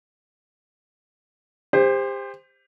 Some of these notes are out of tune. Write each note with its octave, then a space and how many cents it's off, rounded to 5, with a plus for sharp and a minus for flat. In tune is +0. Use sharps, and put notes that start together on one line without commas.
G4 +35 C5 +0